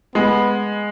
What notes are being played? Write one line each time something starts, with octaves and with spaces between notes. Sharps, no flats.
G#3 B3